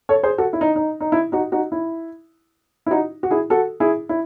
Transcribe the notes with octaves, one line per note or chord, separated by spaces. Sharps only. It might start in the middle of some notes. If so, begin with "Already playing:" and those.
A4 C#5
G#4 C5
F#4 A4
E4
D#4
D#4
D#4
E4
D#4 F#4
D#4 F#4
E4
E4
D#4 F#4
F#4
E4 G#4
F#4 A4
E4 G#4
E4